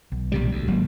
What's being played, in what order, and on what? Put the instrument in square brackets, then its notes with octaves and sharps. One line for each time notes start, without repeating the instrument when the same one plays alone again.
[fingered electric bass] B1
[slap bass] A#1 C3 G3
D2
[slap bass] G#1 [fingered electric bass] F#3 A#3